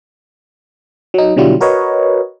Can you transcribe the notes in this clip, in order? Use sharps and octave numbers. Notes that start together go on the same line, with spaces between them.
F#3 D#4
B2 D3 F#3 G3 E4 F4
F#4 A#4 B4 C#5 D#5